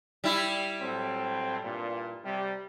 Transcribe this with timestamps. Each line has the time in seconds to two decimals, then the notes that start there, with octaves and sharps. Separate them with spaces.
0.24 G3 E4
0.80 A2 F#3 C4
1.64 G2 A#2
2.24 C3 G3